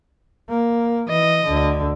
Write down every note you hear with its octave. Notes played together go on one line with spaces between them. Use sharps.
A#3
E3 D#5
D2 D3